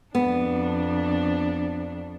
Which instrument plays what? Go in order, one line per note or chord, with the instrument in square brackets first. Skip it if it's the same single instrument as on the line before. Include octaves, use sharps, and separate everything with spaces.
[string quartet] F2 D4 [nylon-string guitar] B3